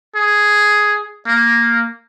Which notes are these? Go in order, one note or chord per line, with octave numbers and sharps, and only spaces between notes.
G#4
A#3